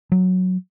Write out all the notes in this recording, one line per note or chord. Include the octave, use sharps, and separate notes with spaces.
F#3